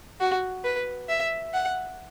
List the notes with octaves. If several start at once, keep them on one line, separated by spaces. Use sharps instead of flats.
F#4
B4
E5
F#5